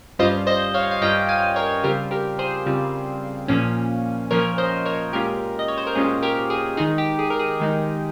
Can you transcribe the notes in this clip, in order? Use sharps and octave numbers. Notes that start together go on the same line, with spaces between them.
G2 G3 C#4 F4 C5 D#5
C5 D#5
C#5 F5
F5
G2 G3 C#4 F4 D#5 G5
F5 G#5
A#4 C#5
C#3 G3 C4 F4 G4 A#4
G4 A#4
G#4 C5
C#3 G3 C4 F4
A#2 F3 A#3 C#4
A#2 F3 A#3 C#4 A#4 C#5
C5 D#5
A#4 C#5
A#2 G#3 C#4 F4 G4 A#4
D#5
C#5
C5
A#4
A#2 G#3 C#4 F4 G#4
G4 A#4
G#4
D#3 G#3 D#4 G#4
G4
G#4
A#4
G#4
D#3 G#3 D#4